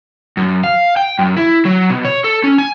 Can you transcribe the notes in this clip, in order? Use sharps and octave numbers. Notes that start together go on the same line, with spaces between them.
F#2
F5
G5
F#2
E4
F#3
B2
C#5
A4
C#4
G#5